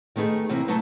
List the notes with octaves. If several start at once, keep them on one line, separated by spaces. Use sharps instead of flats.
D#3 A3 B3 D#4 G#4
C3 E3 A#3 C4
F#3 A3 B3 D#4 A5